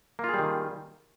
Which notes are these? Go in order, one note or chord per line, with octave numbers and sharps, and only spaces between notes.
D#3 G3 A#3 F4 G#4